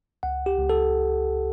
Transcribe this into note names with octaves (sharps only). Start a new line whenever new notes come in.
C#2 F#5
G4
C#2
A4